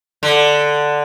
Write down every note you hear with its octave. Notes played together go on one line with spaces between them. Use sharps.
D3